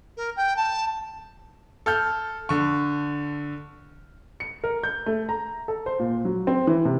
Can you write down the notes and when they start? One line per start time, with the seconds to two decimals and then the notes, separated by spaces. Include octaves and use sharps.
0.17 A#4
0.36 G5
0.56 A5
1.86 A4 F6 G6
2.49 D3 C#6
4.40 C#7
4.64 A#4
4.83 G6
5.06 A3
5.29 A#5
5.68 A4
5.86 C5
5.99 A#2
6.25 F#3
6.47 C4
6.67 E3
6.85 C3